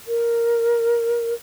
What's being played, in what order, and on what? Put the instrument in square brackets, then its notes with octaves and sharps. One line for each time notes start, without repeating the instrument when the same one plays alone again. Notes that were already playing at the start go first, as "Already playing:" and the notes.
[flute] A#4